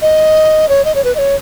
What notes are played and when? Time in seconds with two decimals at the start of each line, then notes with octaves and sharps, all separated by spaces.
0.02 D#5
0.69 C#5
0.85 D#5
0.95 C#5
1.04 B4
1.15 D#5
1.18 C#5